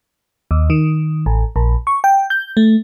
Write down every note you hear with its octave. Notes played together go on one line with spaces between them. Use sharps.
D#2
D#3
A1
A#1
C#6
G5
G6
A3